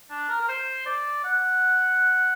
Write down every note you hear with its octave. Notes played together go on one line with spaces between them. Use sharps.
D4
A#4
A#4
C5
D5
F#5